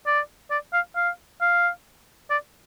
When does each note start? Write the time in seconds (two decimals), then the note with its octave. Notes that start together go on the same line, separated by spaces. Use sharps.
0.07 D5
0.51 D5
0.73 F5
0.96 F5
1.42 F5
2.30 D5